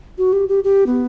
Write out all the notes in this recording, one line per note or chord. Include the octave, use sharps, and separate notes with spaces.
F#4
G4
G4
G4
B3